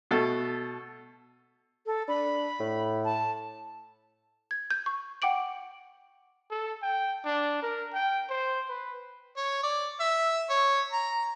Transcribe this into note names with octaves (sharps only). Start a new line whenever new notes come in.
B2 A3 A4
A4
D4 B5
A2
A5
G#6
G6
C#6
F#5 G5 D6 D7 F#7
A4
G5
D4
A#4
G5
C5
B4
C#5
D5
E5
C#5
A#5